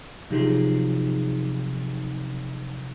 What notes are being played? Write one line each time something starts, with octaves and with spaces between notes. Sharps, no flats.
C3 F3 F#3 D#4 G4 G#4